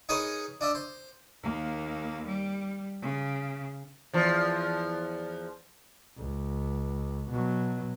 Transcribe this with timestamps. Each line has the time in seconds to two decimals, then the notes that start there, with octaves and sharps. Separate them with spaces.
0.09 D#4 G#4 A#4 B4 C#5 D#5
0.61 D4 D#5 E5
0.75 C5
1.43 D#2 A#3
2.26 G3
3.02 C#3
4.13 E2 F3
6.17 C#2
7.30 B2 F#3